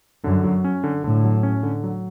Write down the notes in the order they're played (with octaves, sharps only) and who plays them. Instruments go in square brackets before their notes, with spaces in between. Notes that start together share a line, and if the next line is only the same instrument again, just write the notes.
[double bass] F#2 [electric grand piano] D3
[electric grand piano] F#3
C#4
D3
[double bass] A2 [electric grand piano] D3
[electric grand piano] F#3
C#4
D3
F#3